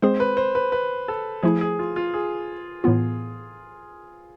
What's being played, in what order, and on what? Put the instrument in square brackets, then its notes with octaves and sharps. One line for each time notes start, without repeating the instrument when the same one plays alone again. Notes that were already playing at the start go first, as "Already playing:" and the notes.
[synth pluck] G#3 C4 G#4 [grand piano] C5
[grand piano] B4
C5
B4
B4
A4
[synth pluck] F3 A3 E4 [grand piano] G#4
[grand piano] G#4
F4
F4
G#4
[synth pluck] A2 E3 B3 F4